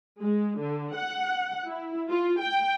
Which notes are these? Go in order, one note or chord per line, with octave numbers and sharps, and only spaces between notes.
G#3
D3
F#5
E4
F4
G5